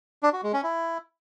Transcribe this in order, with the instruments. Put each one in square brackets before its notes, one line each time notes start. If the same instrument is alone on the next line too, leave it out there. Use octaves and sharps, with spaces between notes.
[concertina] D4
F#4
G#3
C#4
E4